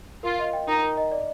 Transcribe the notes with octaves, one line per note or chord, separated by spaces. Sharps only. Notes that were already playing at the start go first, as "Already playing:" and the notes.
F4 A#4
D#5
G5
D#4 A#4
A#4
D#5
D5